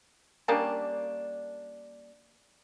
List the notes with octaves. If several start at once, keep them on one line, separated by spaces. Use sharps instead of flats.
G3 A#3 C#4 D4